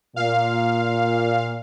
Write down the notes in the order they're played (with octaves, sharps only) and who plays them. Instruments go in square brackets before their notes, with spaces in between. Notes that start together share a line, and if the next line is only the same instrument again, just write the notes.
[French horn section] A#2 [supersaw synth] F5